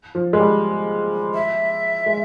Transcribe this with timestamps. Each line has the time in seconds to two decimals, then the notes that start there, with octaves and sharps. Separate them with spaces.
0.15 F3
0.33 G#3
0.39 G3
1.34 E5
2.06 G#3